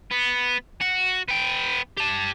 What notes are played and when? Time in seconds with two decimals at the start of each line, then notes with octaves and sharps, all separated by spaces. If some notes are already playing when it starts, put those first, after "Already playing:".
0.11 B3
0.81 F#4
1.28 B3 G5
1.97 G4 A5